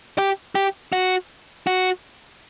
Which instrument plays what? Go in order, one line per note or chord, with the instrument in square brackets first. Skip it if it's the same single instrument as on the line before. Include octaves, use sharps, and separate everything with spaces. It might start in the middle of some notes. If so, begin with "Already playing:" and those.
[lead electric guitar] G4
G4
F#4
F#4